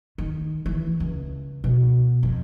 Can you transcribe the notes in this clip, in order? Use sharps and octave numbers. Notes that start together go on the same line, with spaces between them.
D#3
E3
C#2
B2
F2